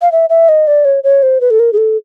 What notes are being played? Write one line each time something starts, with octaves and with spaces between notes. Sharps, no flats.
F5
E5
E5
D#5
D5
C#5
C#5
C5
B4
A4
A#4
G#4
A4